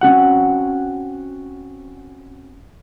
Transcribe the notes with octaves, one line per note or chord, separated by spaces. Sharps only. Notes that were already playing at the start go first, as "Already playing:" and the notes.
C4 C#4 F#4 F#5